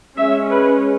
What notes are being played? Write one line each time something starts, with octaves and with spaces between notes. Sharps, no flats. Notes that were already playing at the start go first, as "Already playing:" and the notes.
G#3 C#4 E5
B4